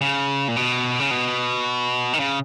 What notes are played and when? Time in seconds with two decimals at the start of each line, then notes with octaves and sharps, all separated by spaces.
0.01 C#3
0.48 A#2
0.56 B2
1.00 C#3
1.11 B2
2.13 D#3
2.20 C#3